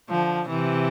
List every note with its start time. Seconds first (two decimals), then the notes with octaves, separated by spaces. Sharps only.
0.10 D3 F3
0.49 C3 E3